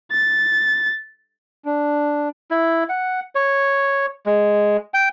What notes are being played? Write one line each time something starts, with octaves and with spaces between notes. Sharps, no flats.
A6
D4
E4
F#5
C#5
G#3
G5